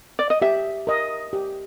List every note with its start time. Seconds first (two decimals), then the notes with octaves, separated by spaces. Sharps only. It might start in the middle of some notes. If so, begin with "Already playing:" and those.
0.19 D5
0.30 D#5
0.42 G4 E5
0.87 A#4 D#5
1.33 G4